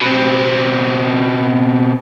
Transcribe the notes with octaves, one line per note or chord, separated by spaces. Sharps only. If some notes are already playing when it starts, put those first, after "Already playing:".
B2 C4